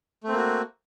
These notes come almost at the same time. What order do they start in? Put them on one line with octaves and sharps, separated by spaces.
A3 C4 A#3 F#4